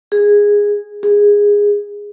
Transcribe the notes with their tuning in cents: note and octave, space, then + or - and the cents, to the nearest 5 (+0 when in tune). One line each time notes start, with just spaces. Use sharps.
G#4 -10
G#4 -15